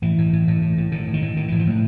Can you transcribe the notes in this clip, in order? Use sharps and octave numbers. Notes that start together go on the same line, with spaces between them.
A2 E3
A2
A2
A2
A2
A2
A2 D#3
A2
D#3
A2
A2 D#3
A2 E3
F3
A2 G3